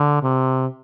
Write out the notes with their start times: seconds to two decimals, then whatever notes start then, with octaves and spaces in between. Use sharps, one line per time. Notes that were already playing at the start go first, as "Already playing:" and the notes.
Already playing: D3
0.23 C3